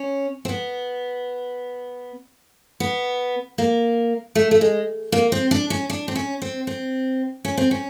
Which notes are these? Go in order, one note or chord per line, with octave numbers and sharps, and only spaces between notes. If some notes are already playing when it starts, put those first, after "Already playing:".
Already playing: C#4
C4
B3
B3
A#3
A3
A3
G#3
A#3
C4
D4
C#4
D4
C4
C#4
C4
C4
C#4
C4
C#4